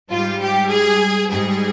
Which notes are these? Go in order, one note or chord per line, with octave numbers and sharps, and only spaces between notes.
G#2 G3 F4
G4
G#4
G#2 G3 G#4